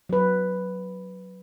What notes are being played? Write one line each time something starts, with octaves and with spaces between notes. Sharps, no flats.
F#3 B4